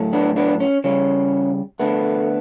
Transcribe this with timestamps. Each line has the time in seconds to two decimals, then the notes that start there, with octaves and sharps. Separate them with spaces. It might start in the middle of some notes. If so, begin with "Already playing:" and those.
Already playing: A2 F#3 A3
0.13 B3 D4
0.36 B3 D4
0.60 C#4
0.84 C#3 G3 C#4
1.80 D3 A3 B3